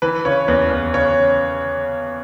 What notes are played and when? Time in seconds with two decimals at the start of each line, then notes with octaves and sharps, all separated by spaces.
0.02 E3 B4
0.25 C#3 C#5
0.48 E2 B4
0.71 E2
0.94 C#3 C#5